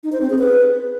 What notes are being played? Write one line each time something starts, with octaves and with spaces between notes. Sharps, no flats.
D#4
C5
C4
G#4
B4